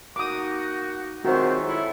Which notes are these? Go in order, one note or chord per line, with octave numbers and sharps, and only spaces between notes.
A#3 D#4 F#4 D6 D#6
D#3 F#3 G#3 C4 F4 F#4 C5 E5
E4 A4 C#5